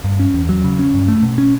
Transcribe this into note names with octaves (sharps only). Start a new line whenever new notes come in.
G2
C#4
E2
F#3
C#3
C#4
G2
A3
B2
C#4